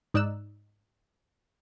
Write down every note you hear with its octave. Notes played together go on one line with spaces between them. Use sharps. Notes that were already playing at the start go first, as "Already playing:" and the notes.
G#2 D#4 D5 E6 F#6 E7